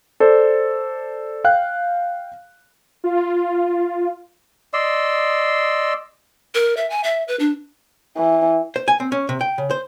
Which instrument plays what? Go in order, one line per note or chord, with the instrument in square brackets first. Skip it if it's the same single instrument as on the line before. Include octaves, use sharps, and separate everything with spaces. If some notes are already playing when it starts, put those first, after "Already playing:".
[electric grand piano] A4 C5 D5
F5 G5 F#6
[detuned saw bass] F4
[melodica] D5 D#5 C6 E6
[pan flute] A#4
E5
G#5
E5
B4
D4
[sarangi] E3
[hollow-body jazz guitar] C5
G#5
C4
C#4
C3
G5
C#3
C5